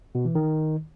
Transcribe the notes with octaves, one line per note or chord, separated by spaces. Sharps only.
B2
E3
D#3